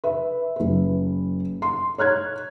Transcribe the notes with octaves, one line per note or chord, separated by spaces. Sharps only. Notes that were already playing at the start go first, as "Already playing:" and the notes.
B4 E5
F#1 B4
C6
C#5 F6 F#6 G#6